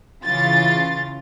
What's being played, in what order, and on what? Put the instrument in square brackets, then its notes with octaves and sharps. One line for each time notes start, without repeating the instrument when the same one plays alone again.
[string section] C#3 E3 F4 A6